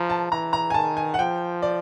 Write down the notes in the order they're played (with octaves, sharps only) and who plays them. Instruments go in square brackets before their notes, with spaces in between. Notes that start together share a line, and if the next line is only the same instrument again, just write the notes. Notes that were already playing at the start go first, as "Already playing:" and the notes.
Already playing: [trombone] F3 [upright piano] A#5
[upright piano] A5
[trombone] E3 [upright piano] A#5
[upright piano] A#5
G#5
[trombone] D#3 [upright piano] A5
[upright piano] G#5
F#5
[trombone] F3 [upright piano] G5
[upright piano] D5